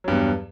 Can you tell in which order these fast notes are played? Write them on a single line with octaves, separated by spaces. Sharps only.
F#3 G2 E2